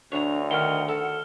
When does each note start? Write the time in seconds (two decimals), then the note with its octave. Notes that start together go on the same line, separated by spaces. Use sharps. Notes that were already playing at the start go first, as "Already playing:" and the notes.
0.12 D2 D4 C#5 A#5
0.51 D#3 F#5 F6 G7
0.89 A4